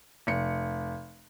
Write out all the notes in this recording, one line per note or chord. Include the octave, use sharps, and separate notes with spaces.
F1 C#7